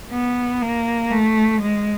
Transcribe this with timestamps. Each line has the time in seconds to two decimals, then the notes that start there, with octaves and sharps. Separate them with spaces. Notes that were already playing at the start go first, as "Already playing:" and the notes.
0.12 B3
0.62 A#3
1.11 A3
1.61 G#3